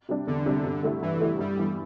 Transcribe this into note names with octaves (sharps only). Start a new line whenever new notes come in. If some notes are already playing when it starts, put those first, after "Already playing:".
C3 G3 D4
E2 D3
C3 G3 D4
G2
D3 A3 E4 G4
G2 E3
D3 A3 E4 G4
G2 G3
E3 B3